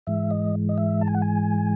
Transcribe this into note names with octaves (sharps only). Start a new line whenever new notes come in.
G#2 E3 G#3 E5
D#5
D#5
E5
A5
G#5
F#5
G#5